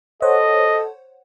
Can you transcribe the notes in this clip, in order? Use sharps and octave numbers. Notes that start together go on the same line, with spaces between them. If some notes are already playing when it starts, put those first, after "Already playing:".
A4 C5 C#5 D#5 F#5